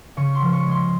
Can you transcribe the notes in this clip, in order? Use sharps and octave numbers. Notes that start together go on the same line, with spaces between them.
C#3 C#6
C6
F3
C#6
G#3 C6